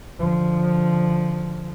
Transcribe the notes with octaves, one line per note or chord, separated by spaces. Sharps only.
D3 F3